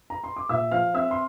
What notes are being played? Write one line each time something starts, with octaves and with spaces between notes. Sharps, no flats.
A#5
C6
D6
A#2 E5 E6
F3 F5 F6
C4 E5 E6
C6